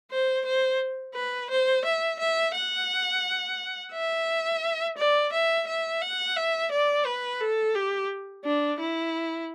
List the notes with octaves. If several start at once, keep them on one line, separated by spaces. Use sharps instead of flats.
C5
C5
B4
C5
E5
E5
F#5
E5
D5
E5
E5
F#5
E5
D5
B4
A4
G4
D4
E4